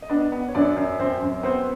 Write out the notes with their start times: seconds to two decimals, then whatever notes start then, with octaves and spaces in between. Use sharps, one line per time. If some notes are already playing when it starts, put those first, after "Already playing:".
0.02 D#5
0.10 B3 D4 D5
0.32 B3
0.48 C#5
0.55 F#2 D4 D5
0.77 F#2
0.99 F#2 C4 C5
1.22 F#2
1.43 B3 C4 C5